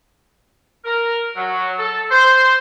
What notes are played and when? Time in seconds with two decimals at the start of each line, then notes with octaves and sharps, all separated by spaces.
0.85 A#4
1.36 F#3
1.77 A4
2.10 C5